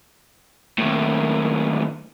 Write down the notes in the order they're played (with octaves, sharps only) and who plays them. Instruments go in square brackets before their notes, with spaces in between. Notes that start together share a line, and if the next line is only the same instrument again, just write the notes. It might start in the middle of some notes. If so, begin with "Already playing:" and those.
[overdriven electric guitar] D#2 A2